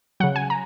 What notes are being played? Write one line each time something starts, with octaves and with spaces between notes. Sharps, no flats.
C#3 F#3 F#5
G#5
A#5